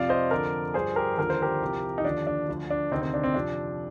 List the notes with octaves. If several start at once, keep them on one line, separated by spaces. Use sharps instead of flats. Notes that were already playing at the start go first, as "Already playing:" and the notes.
Already playing: F2 C3 F3 D5 F5
C5 D#5
F2 D3 F3 A#4 D5
G2 F3 G#4 C5
G4 A#4
D#2 D3 F3 A#4
C5
G4 A#4
C2 C3 F3
D#4
D#2 D3 F3 D4
D4
D2 D3 F3
D4
D2 C3 D#3 C4 D#4
C4
D4
C4
F2 C3 F3 D4